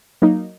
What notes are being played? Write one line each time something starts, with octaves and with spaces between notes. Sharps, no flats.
F#3 A#3 D#4